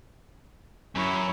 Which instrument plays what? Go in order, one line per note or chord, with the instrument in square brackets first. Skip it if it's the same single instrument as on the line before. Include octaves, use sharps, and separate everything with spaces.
[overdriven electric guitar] F#2 [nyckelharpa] E4 C#5